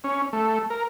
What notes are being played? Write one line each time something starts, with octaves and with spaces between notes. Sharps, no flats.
C#4
A3
A#4